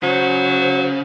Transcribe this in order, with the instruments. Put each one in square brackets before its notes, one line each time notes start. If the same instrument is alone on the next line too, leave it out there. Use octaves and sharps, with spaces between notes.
[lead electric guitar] C#3 [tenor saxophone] F#3 [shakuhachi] C5